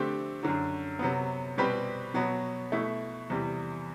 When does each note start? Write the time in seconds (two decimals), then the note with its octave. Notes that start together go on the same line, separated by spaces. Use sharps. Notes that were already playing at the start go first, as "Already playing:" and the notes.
Already playing: D3 A3 C4 G4
0.43 F#2 D3 F#3
0.99 C3 F#3 B3
1.58 B2 G3 C4 G4 B4
2.14 B2 F#3 B3
2.72 B2 A3 E4
3.30 E2 C3 G3